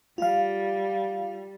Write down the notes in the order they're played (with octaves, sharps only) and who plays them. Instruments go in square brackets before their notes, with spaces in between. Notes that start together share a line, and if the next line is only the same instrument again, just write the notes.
[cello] G3 [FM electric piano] F4 F5